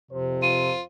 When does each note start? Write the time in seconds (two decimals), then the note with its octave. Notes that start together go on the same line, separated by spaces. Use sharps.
0.11 F2 C3 C5
0.42 F4 D#7